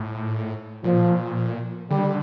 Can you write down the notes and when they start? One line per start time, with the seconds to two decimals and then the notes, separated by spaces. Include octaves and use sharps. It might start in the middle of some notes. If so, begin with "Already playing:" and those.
Already playing: A2
0.84 A#2 F3
1.90 D3 G3